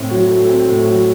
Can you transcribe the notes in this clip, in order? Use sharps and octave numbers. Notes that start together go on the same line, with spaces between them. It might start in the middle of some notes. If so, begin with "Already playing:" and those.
Already playing: A2 A3 C4
F#3
A3
C4
A2
F#3